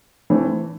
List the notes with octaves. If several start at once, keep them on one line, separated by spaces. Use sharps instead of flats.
E3 A3 C4